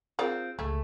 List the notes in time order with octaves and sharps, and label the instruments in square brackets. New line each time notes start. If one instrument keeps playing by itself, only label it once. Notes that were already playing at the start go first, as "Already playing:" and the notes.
[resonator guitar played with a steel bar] C4 F4 [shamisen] G#4 A#4 D5
[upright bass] C#2 [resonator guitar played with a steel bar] A3 [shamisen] G#4